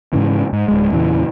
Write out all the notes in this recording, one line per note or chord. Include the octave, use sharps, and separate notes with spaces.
G#2 C#3 E3
G#2
D1 G#3
E2 A#2 C#3 E3